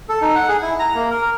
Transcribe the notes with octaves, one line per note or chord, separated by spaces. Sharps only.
A4
D#4
F#5
G#4
E4
A#5
A#3
A#4